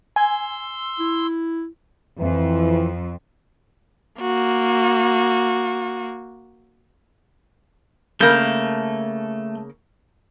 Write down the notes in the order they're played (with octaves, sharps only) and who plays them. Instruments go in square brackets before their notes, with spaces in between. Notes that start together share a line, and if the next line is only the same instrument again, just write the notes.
[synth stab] G#5 [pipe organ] C6 E6
[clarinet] E4
[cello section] F2 [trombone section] E3
[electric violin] A#3 F#4
[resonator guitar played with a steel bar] C#3 A#3 [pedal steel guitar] A3 G6